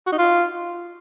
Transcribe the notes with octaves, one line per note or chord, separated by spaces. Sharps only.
F#4
D#4
F4